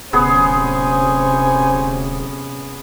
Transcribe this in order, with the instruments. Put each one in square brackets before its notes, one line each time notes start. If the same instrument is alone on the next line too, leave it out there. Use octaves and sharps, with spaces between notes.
[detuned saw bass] D1 [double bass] C3 C#4 [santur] B3 G#4 [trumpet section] C5 G#5